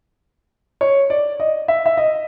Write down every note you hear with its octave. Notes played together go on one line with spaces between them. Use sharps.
C#5
D5
D#5
E5
E5
D#5